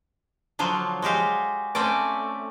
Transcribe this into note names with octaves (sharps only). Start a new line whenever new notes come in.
D3 F3 F#3 F4
G#3 F#4 G4 F5
A3 C4 C#4 D5